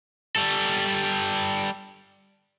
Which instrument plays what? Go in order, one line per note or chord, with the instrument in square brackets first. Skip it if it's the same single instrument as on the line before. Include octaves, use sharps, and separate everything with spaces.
[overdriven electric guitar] G3 A4